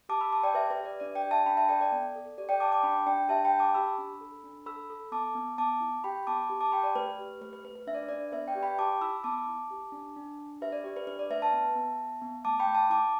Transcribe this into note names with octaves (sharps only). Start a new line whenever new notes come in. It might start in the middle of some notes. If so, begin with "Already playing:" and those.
G4 A5 D6
B5 E6
G4 A5 D6
D5 G5
G4 B4 E5
B4 E5
G4
D5
D4 D5
D5 G5
G4
E5 A5
D4 G5 B5
E5 A5
A4 D5 G5
D5
B3
A4
G4 D5
D5 G5
G4 A5 D6
A5 D6
D4 G5 B5
D4 D5 G5
G4 E5 A5
G5 B5
G4
A5 D6
G4 B5 E6
D4
A4
D4
A4 B5 E6
A4
B3 A5 D6
B3
B3 A5 D6
E4
G4 G5 B5
B3 A5 D6
G4
A5 D6
G4 G5 B5
D5
A3 B4
G4
A3 B4
B4
A3 B4
B4
D4 E5
D5
B4
D4 D5
B3 B4 E5
D5 G5
G4
G5 B5
G4 A5 D6
E4 B5 E6
B3 A5 D6
E4
G4
D4
D4
D4
G4 B4 E5
D5
G4 D5
B4
D4 B4
D5
A3 B4 E5
E5 A5
B3
B3
B3
B3
A3 A5 D6
G5 B5
A3
A5 D6
E4 A5 D6